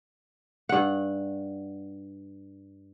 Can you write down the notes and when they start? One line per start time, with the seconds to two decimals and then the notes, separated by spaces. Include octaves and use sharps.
0.69 G2 F#5